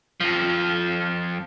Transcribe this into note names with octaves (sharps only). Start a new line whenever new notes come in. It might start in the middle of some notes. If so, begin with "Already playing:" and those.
F2 F3